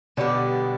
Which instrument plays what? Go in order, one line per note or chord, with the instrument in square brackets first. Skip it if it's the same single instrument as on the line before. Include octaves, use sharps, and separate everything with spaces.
[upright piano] B2 [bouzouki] D3 G3 B3 D4